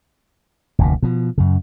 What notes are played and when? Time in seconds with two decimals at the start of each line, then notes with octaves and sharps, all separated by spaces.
0.79 F1 D2 A#2
1.03 B2 F3
1.38 F#2 C#3